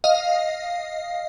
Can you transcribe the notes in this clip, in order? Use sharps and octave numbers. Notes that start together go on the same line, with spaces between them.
D#5 F5